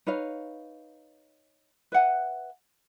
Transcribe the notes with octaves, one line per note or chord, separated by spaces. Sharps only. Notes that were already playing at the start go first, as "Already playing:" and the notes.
D#4 B4 C#5 F5
B4 E5 F#5 G#5